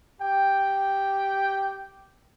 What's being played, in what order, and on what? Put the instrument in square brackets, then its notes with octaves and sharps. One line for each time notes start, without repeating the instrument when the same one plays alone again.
[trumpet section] G4 G5